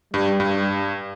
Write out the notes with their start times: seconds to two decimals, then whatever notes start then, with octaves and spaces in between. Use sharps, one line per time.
0.14 G2 G3
0.40 G2